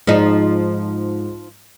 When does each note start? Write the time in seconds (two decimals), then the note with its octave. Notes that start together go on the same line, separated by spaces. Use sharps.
0.07 G#2 F3 D#4